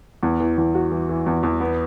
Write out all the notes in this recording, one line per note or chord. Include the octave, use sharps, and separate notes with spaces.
E2
E3
E2
F#4
E3
E3
E2
E2
B3